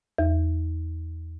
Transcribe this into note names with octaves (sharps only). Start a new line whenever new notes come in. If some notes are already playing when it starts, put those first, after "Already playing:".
E2